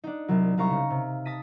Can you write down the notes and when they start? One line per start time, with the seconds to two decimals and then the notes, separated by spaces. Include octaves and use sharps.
0.04 D4 D#4
0.28 C2 F#3
0.57 C2 G3 F5 A#5 C#6
0.70 C#3
0.90 C3
1.25 A5 D#6 A#6 B6 D#7